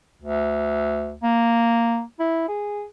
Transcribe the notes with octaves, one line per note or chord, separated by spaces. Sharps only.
D2
A#3
E4
G#4